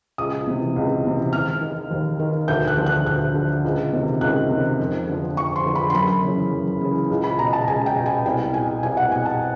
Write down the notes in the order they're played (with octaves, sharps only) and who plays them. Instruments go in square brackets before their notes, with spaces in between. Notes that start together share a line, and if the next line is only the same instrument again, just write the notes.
[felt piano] C#2 D#6
C3 E3
C#2
C3 E3
D#2 F6
D#3
D#2
D#3
D2 G6
F#6
D3 F3
F#6
D2 F#6
D3 F3
C#2
C3 D#3
C#2 F#6
C3 D#3
F2
D3 F3
F2 C#6
C6
D3 F3
B5
C6
F#2 B5
C#3 E3
F#2
C#3 E3
C#2
B5
B2 A#5
A5
C#2 G#5
G5
B2
G#5
C2 G5
B2 G#5
C2 G#5
F#5
B2 G#5
A5